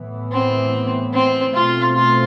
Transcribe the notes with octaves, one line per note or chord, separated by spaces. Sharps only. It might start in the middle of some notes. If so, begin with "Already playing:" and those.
Already playing: A2 E3 B3
C4
C4
B2 A3 C4 F4
F4